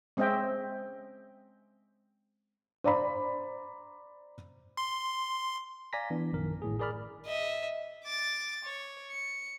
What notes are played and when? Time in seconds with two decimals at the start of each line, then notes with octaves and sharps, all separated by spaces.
0.17 G#3 C4 C#4 D#5 E5 G5
2.84 C5 D5 A#5 B5
4.77 C6
5.93 D5 F5 G#5 A#5 A#6 B6
6.10 E3 B3 D4
6.32 A#1 F#2 D#3 A#4
6.62 G#1 A2 G#4
6.79 G#4 A#4 D5 B5 F6
7.26 D#5 E5
8.04 D6 A6
8.65 C#5
9.10 C#7